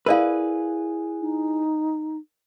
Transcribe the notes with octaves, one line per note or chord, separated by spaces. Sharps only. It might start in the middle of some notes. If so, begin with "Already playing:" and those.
E4 G#4 A#4 B4 D5 F5
D#4